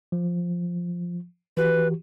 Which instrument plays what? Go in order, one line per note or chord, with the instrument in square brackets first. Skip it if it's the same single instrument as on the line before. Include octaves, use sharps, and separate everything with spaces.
[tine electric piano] F3
[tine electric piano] E3 F#4 G4 [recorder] B4